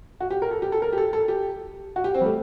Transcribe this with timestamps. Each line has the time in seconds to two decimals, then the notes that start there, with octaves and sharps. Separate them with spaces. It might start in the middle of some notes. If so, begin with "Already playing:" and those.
0.20 F#4
0.31 G4
0.42 A#4
0.51 A4
0.62 G4
0.72 A4
0.82 A#4
0.93 G4
0.98 A4
1.13 A4
1.28 G4
1.96 F#4
2.04 G4
2.14 C4
2.21 G3
2.25 A3